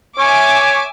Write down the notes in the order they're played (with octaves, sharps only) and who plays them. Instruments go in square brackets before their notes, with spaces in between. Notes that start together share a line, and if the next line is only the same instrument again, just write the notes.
[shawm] C#5 [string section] E5 G#5 D6